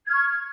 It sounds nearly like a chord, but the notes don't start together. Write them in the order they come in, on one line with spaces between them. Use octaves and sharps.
G#6 F6 C#6